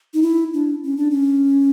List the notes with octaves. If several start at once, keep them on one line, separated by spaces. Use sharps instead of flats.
D#4
E4
D4
C#4
D4
C#4